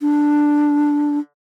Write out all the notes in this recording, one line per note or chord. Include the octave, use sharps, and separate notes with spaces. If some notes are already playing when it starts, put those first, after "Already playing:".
D4